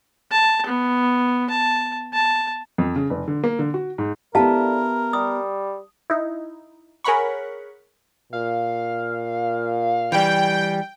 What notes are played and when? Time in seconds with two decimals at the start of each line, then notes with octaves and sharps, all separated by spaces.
0.31 A5
0.66 B3
1.50 A5
2.14 A5
2.78 F2
2.96 C#3
3.10 F1
3.28 D3
3.44 A#3
3.59 D3
3.74 F#4
3.98 G#2
4.35 D3 B3 E4 G4 A#4 F5 A5
5.13 G3 D#6
6.10 D#4 E4
7.04 G#4 A#4 C#5 F#5 B5 C#6
8.33 A#2 F5
10.12 E3 G3 G5